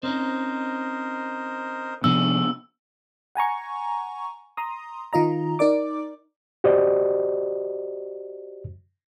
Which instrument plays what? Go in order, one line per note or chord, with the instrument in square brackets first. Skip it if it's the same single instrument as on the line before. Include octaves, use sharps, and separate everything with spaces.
[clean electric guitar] C4 C#4 D#4 [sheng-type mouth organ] A#4 C5 D#5
[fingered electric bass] C3 F3 B3 [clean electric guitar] D4 D#4 G#4 [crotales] E6
[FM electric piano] F#5 G#5 A#5 C#6
A#5 C6 D#6
D#3 F4 D#5 A#5
D#4 A#4 D5 D6
[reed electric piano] F#4 G4 C5 D5 D#5